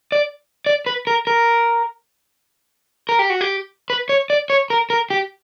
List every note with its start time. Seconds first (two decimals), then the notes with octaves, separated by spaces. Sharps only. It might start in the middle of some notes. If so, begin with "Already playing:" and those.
0.12 D5
0.66 D5
0.86 B4
1.07 A#4
1.27 A#4
3.09 A#4
3.19 G4
3.30 F#4
3.41 G4
3.90 B4
4.09 C#5
4.30 D5
4.50 C#5
4.70 A#4
4.90 A#4
5.10 G4